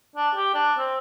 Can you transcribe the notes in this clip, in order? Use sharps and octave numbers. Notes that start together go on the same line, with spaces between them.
D4
G4
D4
C4